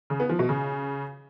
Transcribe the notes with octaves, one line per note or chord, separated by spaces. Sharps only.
C#3
B3
F3
B2
C#3